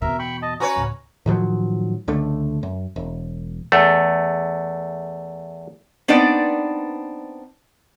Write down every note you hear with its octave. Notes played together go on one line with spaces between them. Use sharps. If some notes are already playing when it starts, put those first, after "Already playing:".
E2 B2 A#4 E5
G5 B5 C#6
D#5 A5
C#4 F#4 B4 C#5 A#5
C#2 A2
A2 D#3 F3 F#3
C#2 D3 A3
F#2
E1
E2 A3
B3 C4 D4 D#4 B4 D5